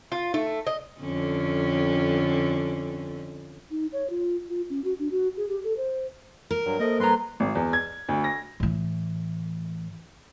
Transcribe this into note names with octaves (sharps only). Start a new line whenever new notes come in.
F4
A3 D#4
D#5
F2 D3 C#4
D#4
C#5
F4
F4
C#4
F#4
D4
F#4
G#4
G4
A4
C5
A#4
G2 F#3
A#3 A4 C5 D#5
G2 B4 A#5 C6
G#1
E2
G#6
D2
A#6
A2 E3